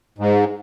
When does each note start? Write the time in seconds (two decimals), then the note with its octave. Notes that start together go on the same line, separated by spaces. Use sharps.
0.18 G#2